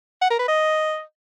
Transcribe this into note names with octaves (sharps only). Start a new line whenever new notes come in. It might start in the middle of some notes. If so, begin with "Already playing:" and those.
F#5
A#4
B4
D#5